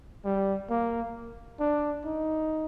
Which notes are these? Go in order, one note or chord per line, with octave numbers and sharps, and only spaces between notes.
G3
A#3
D4
D#4